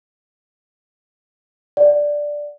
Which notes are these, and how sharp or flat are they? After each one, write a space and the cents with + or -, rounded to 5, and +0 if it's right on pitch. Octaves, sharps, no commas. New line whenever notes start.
D5 +0 F#5 +0